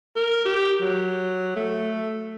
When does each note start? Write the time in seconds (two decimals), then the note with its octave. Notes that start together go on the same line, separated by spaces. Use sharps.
0.16 A#4
0.45 G4
0.81 F#3
1.56 A3